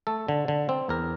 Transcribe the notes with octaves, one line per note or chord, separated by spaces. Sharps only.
A3 A4
D3
D3
C4
E2 A#4